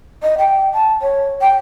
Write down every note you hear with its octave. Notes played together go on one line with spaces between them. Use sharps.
D#5
G5
A5
C#5
G5